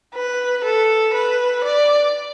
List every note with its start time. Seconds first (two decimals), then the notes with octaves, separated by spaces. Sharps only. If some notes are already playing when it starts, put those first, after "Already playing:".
0.14 B4
0.64 A4
1.14 B4
1.64 D5